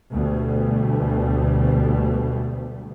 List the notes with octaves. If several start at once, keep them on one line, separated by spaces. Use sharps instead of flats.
D2 B2 G3 A3